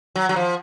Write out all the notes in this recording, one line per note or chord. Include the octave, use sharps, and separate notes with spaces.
F#3
F#3
F3